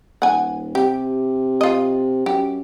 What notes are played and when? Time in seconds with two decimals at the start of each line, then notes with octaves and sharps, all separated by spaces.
0.22 D#1 F#5 G#5
0.75 C3 G4
1.61 F4 D#5
2.26 F#2 G4